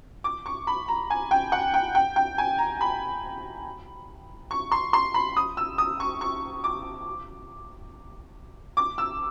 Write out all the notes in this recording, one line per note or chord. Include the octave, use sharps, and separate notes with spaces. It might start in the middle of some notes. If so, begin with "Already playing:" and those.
D6
C#6
B5
A#5
G#5
G5
F#5
G5
G5
G5
G#5
A#5
B5
C#6
C6
C6
B5
D#6
E6
D#6
C#6
C#6
D6
D6
E6